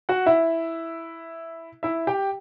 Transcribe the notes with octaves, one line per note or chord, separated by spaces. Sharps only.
F#4 F#5
E4 E5
E4 E5
G4 G5